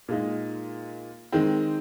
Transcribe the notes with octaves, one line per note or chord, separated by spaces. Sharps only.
A#2 G#3 D#4
D#3 G#3 C4